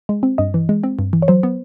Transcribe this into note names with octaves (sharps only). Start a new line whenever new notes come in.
G#3
C4
G2 D#5
E3
G#3
C4
G2
E3
C#5
F#3 C5
B3